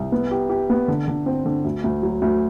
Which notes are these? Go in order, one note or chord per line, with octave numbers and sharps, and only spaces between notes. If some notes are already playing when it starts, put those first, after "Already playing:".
Already playing: C2
B3
G4
G4
B3
D3
D3
C4
D3
D2
D2
F#3
D2